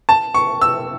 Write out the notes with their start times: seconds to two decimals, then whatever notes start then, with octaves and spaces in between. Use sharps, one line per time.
0.09 A5
0.34 C#6
0.61 E6